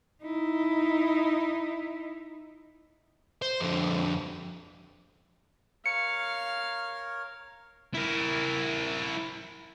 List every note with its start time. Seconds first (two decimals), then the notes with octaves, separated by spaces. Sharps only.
0.23 D#4 E4
3.42 C5
3.61 F2 D3
5.86 A#4 C#5 F5 C#7
7.95 E4 A#4